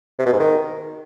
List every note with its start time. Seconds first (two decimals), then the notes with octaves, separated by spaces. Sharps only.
0.19 C3
0.26 B2
0.33 G#2
0.40 D#3